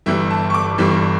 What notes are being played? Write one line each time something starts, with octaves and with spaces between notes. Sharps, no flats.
G1 G2 E3 G3 E5
A5
C#6
D6
G1 G2 E3 G3